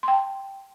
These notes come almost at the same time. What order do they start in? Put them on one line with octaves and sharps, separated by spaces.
C6 G5 A5